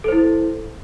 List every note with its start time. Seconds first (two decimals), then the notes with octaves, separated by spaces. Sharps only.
0.04 A4
0.08 C5
0.12 E4